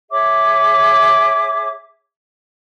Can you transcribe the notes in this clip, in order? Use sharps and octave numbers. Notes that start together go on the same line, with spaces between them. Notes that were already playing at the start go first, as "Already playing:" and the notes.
G#4 C#5 E5 D6